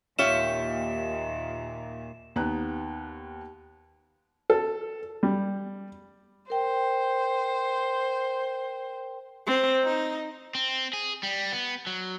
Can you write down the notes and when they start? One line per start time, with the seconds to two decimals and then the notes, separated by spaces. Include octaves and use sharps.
0.19 D#2 A#2 F4 G4 C#5 E5 E7
2.36 D#2 B3 A#5 F#6
4.50 A4
5.23 G3
6.50 A#4 C5 G5
9.47 C4
9.84 D#4
10.55 C4
10.93 G#4
11.23 G3
11.52 B3
11.87 F#3